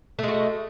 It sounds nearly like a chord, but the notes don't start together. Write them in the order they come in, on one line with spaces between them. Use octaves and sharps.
A3 G#3 F#4